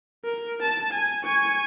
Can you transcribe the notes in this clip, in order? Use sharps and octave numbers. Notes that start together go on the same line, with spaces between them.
A#4
A5
G#5
G#5 C#6